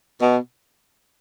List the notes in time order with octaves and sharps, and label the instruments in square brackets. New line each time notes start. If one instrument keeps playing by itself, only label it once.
[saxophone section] B2